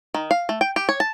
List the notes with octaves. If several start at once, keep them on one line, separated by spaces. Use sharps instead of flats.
D#3
F5
A3
G5
G4
C#5
A5